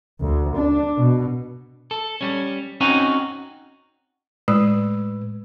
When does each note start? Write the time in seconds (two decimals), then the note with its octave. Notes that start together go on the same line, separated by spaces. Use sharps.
0.20 D2
0.56 D4
0.97 B2
1.91 A4
2.21 G3 C#4
2.81 C4 C#4 D#4 F#4 G#5 A#5
4.48 A2 G#3 B4 E6